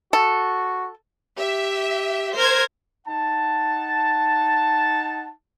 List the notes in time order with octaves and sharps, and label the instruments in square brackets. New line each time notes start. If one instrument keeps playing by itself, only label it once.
[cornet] F#4 [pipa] A4
[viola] G4 [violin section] E5
[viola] A#4 [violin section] C5 G#6
[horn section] D#4 F#5 A5